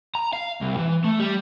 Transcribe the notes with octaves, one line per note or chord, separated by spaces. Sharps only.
A#5
F5
C2
E3
A3
G3